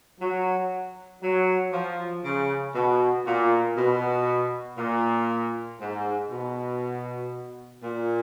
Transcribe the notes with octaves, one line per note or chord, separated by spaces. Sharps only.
F#3
F#3
F3
C#3
B2
A#2
B2
A#2
G#2
B2
A#2